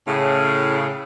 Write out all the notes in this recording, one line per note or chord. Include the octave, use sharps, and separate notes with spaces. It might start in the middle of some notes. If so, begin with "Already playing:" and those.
A2 C#3